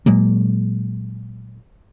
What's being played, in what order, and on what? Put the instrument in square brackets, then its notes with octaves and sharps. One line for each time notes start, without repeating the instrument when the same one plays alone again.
[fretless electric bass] A#2 F#3 G#3 A#3